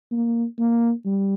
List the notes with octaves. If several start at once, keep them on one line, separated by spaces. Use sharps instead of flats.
A#3
A#3
G3